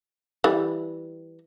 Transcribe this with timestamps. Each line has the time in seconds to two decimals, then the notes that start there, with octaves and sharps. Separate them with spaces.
0.44 E3 G3